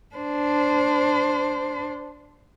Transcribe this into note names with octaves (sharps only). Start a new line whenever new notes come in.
D4 C5